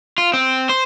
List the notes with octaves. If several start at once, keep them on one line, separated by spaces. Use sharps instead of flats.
F4
C4
C5